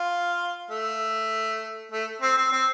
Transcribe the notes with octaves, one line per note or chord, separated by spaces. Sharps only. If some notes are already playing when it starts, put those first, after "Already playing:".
Already playing: F4
A3
A3
C4
C4
C4